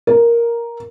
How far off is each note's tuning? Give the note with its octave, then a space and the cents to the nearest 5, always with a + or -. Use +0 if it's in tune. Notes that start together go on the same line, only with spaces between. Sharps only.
A#4 +5